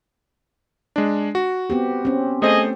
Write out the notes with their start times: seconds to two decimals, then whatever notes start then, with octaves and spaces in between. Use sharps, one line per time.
0.96 G#3 D4
1.35 F#4
1.70 B3 C4 G4
2.05 C4 C#4
2.42 A3 G#4 C5 D#5